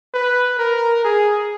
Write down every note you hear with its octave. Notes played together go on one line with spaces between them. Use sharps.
B4
A#4
G#4